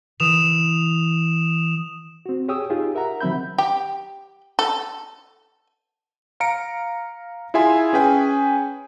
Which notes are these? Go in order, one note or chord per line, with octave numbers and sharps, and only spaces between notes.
E3 D#6 E7 F7
C4 F#4
G4 G#4 C#5 G5 D#6 E6
D#4 F4 G4 G#4
A#4 E5 F#5 A#5
D#3 F#3 C4 E5 B5 G6
G4
A4
F5 A#5 C#7 D7
E4 F4 G#4 E5 G#5 C6
C#4 G#4 B4 G5 G#5